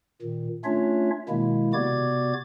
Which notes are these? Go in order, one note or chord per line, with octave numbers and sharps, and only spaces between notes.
A#2 D#3
A3 C#4 D4 F4 C#5 E5
B2 D#3 G#3 A#3 E4
C3 B3 F#4 D5 D6 G#6